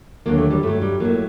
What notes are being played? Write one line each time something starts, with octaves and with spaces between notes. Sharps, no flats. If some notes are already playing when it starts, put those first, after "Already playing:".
D#2 D3 F#3 A#3
A3
G3
G2 F#3 A3
G3
A2 F#3 A#3